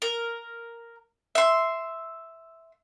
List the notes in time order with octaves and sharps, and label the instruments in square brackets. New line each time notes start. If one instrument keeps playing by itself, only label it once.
[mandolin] A#4
E5 C6